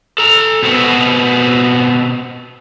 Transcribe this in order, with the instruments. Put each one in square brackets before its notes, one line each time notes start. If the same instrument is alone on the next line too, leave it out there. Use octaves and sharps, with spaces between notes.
[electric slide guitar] A4 A#5
B2 B3 C4 F#4